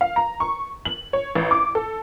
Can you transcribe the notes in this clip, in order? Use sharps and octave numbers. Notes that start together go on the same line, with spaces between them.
F5
A#5
C#6
F#7
C#5
A1
D6
A4